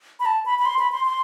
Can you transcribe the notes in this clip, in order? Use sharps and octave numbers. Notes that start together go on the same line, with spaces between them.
B5
A5
B5
B5
C6
B5
C6
C6